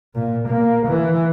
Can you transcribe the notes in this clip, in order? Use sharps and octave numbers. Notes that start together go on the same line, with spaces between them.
A#2
A#3
E3